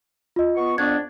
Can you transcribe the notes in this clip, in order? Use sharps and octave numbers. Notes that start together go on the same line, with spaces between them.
F4 D#5
B3 C#6
F2 B3 D4 G#6